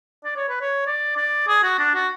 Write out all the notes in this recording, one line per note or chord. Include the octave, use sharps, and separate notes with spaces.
D5
C#5
B4
C#5
D5
D5
G#4
F#4
D4
F#4